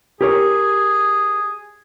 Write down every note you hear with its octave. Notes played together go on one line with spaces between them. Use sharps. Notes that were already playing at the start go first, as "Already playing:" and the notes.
G4 G#4 A#4 C#5